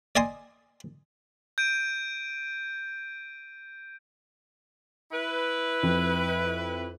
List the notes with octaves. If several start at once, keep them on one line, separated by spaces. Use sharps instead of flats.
D5 D#5 G#5 C6 D#6
G6 D7 D#7
E4 B4
F2